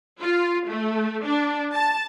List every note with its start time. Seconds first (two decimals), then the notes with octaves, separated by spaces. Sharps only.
0.20 F4
0.68 A3
1.25 D4
1.73 A5